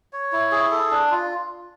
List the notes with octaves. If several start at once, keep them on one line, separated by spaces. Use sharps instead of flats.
C#5
E4
G#4
A4
D4
F4